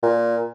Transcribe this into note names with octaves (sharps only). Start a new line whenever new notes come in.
A#2